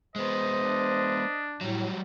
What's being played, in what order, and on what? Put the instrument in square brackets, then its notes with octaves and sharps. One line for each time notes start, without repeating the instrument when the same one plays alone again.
[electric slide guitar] G#3 B3 [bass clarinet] C5 [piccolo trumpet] D#5
[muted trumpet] D4
[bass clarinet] A2 [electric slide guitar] F#3 G3